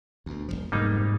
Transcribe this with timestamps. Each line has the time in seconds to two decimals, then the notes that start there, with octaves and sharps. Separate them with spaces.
0.26 D2 B2
0.48 D#1 B1 F3
0.72 F1 G#2 G3 A#3 D#4